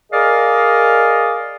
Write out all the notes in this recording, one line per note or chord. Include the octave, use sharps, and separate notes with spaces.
G#4 A#4 D5 D#5 F5